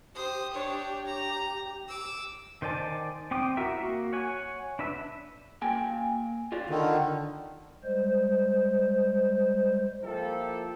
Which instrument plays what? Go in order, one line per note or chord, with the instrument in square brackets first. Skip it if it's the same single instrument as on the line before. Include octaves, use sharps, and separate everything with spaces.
[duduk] G4 [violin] C5 D#6
[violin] D4 C#5
A#5
D6 E6
[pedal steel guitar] D#3 C5 D5 G#5 A5
C4 G5 D6 D#6
E4 F#4 A#4 E5
A#3 F#4
C#5 F#5 G#5
D4 B4 E5
[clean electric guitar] A#3 G5 G#5
F4 C#5 D5
[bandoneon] D3 D#3
[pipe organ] G3 G#3 C5
[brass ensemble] F3 A#3 E4 F4 G4 A4